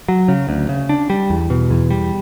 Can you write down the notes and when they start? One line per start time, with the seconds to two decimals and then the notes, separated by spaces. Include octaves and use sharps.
0.08 F#3
0.28 C#3
0.49 D2
0.69 C#3
0.89 D4
1.10 G3
1.30 E2
1.50 B2
1.70 E2
1.90 G3